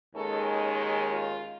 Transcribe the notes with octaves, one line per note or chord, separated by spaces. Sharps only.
D#2 D#3 G#3 C#4 A4
F4